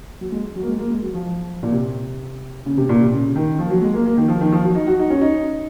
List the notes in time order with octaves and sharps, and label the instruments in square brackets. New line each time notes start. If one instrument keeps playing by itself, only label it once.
[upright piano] F#3
G#3
F#3
A#3
G#3
A#3
G#3
F#3
F3
A#2
C3
C#3
C3
A#2
C3
C#3
D#3
F3
F#3
G#3
A#3
A#3
D#3
F3
D#3
F3
F#3
D#4
F#4
D#4
C#4
D#4